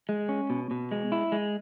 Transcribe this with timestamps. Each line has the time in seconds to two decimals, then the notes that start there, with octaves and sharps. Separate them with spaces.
0.09 G#3
0.29 C#4
0.50 B2
0.71 B2
0.92 G#3
1.12 E4
1.32 G#3